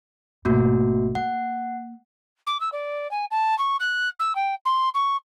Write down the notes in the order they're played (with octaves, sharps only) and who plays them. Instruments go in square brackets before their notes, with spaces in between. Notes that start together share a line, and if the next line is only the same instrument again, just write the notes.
[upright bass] G#1 B2 [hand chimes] A3 A#3 F#4
[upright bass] A#3 [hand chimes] F#5
[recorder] D6
E6
D5
G#5
A5
C#6
F#6
E6
G5
C6
C#6